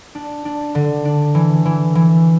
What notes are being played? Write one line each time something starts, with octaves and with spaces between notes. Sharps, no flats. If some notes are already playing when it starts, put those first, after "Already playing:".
D4
D4
D3
D4
E3
E3
E3